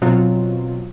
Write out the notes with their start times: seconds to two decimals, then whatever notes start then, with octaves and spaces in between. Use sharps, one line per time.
0.02 B2 F#3 C4 F4